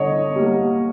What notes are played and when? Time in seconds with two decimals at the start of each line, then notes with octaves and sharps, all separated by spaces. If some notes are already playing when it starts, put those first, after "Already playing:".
Already playing: D3 C#5 D#5
0.36 G3 A#3